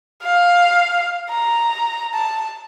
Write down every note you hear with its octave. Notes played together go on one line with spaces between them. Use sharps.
F5
A#5
A5